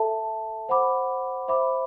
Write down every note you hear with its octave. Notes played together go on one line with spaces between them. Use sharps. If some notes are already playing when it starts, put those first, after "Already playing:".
Already playing: A4 E5 A5
C5 F#5 B5 D6
C5 E5 B5 D6